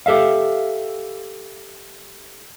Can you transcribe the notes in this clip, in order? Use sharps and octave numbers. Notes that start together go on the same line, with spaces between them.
G4 A4 E5 F5